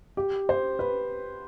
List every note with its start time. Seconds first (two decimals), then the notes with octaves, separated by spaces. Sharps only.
0.17 G4
0.49 C5
0.79 B4